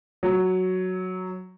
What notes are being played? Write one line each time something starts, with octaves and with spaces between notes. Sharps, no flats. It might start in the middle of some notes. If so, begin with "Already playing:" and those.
F#3